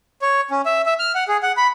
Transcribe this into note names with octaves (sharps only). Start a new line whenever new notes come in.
C#5
C#4
E5
E5
F6
F#5
G#4
F#5
B5